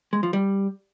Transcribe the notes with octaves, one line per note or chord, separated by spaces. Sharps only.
G#3
F3
G3